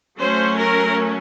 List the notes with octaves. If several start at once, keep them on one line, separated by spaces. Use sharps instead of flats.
F#3 A3 C#4 C5
A#4